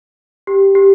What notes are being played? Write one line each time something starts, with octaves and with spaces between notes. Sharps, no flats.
G4
G4